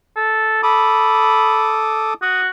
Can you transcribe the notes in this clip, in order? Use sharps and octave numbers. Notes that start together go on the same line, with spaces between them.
A4
A4 B5 D6 D#6
F#4 D#6